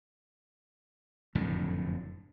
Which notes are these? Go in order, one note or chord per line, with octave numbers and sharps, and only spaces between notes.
F#1 F2 A2 D3